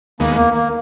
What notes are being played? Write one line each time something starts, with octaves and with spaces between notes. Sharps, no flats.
D#2 D#3 G#3 A#3 B3
A#3
A#3